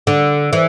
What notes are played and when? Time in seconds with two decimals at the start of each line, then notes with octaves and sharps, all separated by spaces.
0.07 D3
0.53 E3